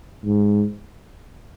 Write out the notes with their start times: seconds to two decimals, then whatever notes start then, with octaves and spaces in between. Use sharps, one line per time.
0.25 G#2